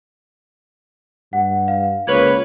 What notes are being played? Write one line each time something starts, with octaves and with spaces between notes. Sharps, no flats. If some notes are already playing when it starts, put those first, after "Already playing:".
G2 F#5
F5
C#2 A#3 B4 C#5 G#6 F#7